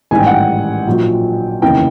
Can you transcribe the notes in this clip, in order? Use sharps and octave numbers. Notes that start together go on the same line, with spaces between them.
A1 G#2 D#3 G3 G#5
G5
F#5
G5
A#1 A#2 F#3
F1 D#2 C#3 E3 G5